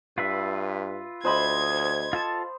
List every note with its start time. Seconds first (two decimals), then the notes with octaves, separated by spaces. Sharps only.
0.18 G2 F4 B4 E5
1.25 D2 C5 D#5 B5 G#6
2.13 F4 A4 A5